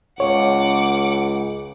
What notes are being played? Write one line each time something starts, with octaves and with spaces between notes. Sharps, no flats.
C#2 C#5 F#5 D6